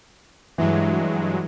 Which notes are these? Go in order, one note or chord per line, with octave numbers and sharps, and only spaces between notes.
G2 E3 F#3 G#3